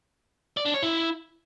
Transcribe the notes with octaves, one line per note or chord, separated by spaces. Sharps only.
D5
D4
C#5
E4